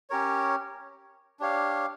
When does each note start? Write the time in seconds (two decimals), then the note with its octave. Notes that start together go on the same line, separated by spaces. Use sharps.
0.10 C#4 G4 A#4 C#5
1.40 D4 G4 C#5 F5